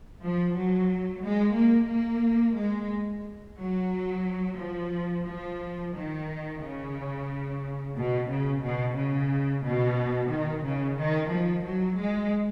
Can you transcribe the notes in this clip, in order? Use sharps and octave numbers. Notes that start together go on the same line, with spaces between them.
F3
F#3
G#3
A#3
A#3
G#3
F#3
F3
F3
D#3
C#3
B2
C#3
B2
C#3
B2
D#3
C#3
D#3
F3
F#3
G#3